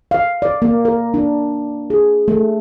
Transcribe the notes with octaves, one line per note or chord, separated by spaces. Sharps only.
F5
D5
A#3
A#4
D4
G#4
A3